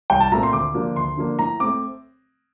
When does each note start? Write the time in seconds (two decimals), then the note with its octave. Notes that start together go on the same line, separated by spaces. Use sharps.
0.10 C2 G5
0.20 A5
0.32 A#2 A3 C4 A#5
0.43 C6
0.52 D2 D6
0.74 D3 F3 A#3 D4
0.96 D2 C6
1.17 D3 F3 A#3 D4
1.38 A2 A#5
1.60 A3 C4 D6